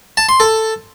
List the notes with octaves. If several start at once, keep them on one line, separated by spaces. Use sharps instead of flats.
A5
C6
A4